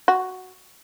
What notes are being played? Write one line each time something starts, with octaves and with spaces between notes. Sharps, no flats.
F#4